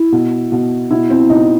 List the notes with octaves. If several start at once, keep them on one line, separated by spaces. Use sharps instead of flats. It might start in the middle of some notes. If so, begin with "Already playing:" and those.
Already playing: E4
B2
B2
B2 E4
C4
B2 D#4